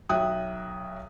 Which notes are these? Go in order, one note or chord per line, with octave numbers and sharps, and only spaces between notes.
B1 F#3 E5 G5 D#6 F#6